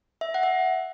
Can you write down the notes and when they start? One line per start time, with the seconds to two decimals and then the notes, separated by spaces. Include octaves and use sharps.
0.21 E5
0.34 F#5
0.43 E5